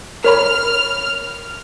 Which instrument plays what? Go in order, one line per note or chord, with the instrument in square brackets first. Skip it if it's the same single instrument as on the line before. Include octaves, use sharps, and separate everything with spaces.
[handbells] A#4 C#5 B5 [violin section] F6